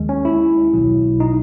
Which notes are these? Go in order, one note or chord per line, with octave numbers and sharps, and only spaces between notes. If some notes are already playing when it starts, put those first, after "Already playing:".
Already playing: D#2 D#3 G#3
C#4
E4
B1 B2 F#3
D#4